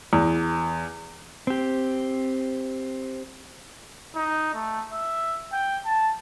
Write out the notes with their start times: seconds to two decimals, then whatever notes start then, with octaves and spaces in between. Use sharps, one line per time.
0.13 E2
1.47 C4 G4
4.15 D#4
4.54 A3
4.92 E5
5.52 G5
5.85 A5